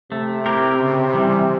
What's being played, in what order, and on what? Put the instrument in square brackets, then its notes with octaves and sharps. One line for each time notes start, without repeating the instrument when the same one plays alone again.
[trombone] C3 [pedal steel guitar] A3
[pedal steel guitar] C4 E4 G4 A#4
C#3
E3 G3